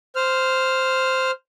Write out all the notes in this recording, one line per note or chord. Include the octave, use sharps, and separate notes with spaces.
C5 F6